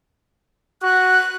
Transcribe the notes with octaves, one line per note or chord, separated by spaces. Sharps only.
F#4 F#6